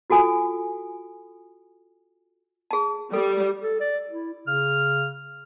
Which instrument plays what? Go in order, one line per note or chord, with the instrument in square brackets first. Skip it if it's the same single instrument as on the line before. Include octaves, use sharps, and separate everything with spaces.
[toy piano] F4 F#4 A4 G#5 D#6
G#4 A5
[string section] G3 [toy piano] A4
[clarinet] A4
D5
E4
[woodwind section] C#3 F6